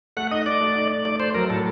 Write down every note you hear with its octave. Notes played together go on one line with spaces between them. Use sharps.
A3 F#5
D#4 D#5
D#4 D5
A3
D#4
D#4
A3 D5
A3 C5
F#3 A#4
A2 A4